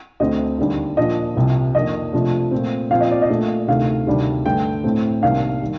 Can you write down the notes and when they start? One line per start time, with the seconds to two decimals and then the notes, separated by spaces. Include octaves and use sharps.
0.20 D2 D3 A3 C4 D#5
0.58 D#2 D3 G3
0.97 A#2 F3 A#3 D4 D#5
1.36 C2 C3 F3
1.75 F2 D#3 A#3 D4 D#5
2.13 C3 F3 A3 D4
2.51 A#2 A3 C4
2.90 A#2 F3 C4 F5
3.00 D#5
3.11 D5
3.22 D#5
3.30 A#2 A3 D4
3.67 D2 C3 D#3 A3 F5
4.07 D2 C3 D#3 G3 D4
4.46 G2 D3 A3 G5
4.84 A2 A3 C4
5.22 C2 C3 D#3 A#3 D4 F5
5.62 D#3 G3